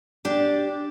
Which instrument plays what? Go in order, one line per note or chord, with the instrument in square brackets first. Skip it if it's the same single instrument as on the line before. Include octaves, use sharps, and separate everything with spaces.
[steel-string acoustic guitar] D4 G4 D5